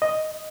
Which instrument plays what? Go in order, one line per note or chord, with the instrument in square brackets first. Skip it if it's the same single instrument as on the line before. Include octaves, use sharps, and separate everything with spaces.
[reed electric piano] D#5